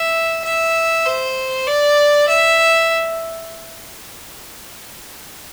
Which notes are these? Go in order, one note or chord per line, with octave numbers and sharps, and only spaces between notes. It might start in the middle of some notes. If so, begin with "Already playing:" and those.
Already playing: E5
E5
C5
D5
E5